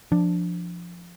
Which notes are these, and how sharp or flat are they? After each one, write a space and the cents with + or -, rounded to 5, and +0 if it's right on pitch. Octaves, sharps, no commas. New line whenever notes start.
F3 +0 D4 +0